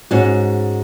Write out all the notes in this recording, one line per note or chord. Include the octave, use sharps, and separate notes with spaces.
G#2 G#3 C#4 F#4